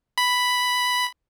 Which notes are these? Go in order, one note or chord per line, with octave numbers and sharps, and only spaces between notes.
B5